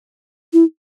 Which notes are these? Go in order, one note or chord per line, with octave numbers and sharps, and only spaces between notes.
E4